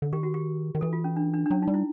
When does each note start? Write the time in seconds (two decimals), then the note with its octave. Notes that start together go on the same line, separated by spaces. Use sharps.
0.02 D3
0.13 D#3 G4
0.23 F#4
0.34 G4
0.75 D#3
0.81 E3 A4
0.93 F4
1.04 C#4
1.16 D4
1.34 D4
1.46 D4
1.50 F#3 C#4
1.62 D#4
1.68 G3
1.74 E4